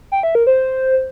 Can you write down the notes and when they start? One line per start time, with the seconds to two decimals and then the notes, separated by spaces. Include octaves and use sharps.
0.12 G5
0.23 E5
0.35 A#4
0.47 C5